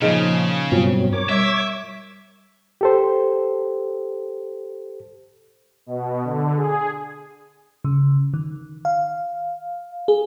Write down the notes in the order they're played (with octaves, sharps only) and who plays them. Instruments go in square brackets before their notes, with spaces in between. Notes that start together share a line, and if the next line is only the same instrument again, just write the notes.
[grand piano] A#2 F3 [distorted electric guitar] C#3 [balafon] D#4 G#4 D#5
[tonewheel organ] G2 B2 F#3 [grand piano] C4 [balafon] F4
[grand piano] A#4 [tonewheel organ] C#5 D6
[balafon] G3 [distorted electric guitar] E5
[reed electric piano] G4 A4 C5
[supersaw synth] B2
D3
G#4
[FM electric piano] C#3
D#3
F5
G#4